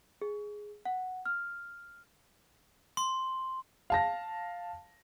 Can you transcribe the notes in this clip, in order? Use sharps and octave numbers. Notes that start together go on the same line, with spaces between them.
G#4
F#5
F6
C6
F5 A5 A#6